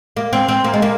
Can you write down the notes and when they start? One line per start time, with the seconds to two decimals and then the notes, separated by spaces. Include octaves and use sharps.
0.17 A#3
0.33 C4
0.48 C4
0.64 A#3
0.74 G#3
0.82 A#3